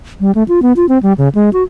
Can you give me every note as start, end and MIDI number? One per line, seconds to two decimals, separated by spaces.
0.20 0.31 55
0.35 0.43 57
0.48 0.62 65
0.62 0.73 59
0.76 0.86 65
0.89 0.98 60
1.03 1.13 55
1.18 1.29 49
1.35 1.50 56
1.53 1.63 66